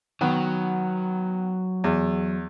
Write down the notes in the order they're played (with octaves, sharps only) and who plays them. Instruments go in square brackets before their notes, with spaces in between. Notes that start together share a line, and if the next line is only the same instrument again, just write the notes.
[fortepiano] D#3 B3 [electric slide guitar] F#3
[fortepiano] E2